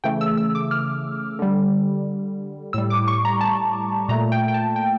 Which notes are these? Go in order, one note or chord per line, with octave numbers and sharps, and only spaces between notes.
C#3 E3 A3 G5
E6
E6
D6
F6
D3 G3
A2 G3 E6
D6
C#6
A#5
A5
A#2 A3 A#5
G5
G5
A5
G5